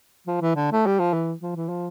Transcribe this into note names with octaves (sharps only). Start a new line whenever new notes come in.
F3
E3
D3
A3
G3
F3
E3
F3
E3
F3